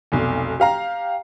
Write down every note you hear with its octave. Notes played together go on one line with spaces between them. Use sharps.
F1 B1
G4 F5 A#5